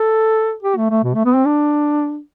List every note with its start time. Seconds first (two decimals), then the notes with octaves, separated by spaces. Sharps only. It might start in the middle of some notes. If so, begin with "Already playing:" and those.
Already playing: A4
0.63 G4
0.77 A3
0.91 A3
1.04 B2
1.15 A3
1.25 B3
1.35 C4
1.46 D4